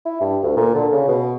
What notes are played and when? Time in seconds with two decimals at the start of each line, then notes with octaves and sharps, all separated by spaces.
0.05 E4
0.21 G2
0.43 D2
0.57 A#2
0.75 D3
0.93 C#3
1.08 B2